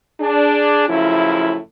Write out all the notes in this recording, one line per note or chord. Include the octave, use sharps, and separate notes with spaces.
D4 G#4
F#2 A2 C#3 F3 E4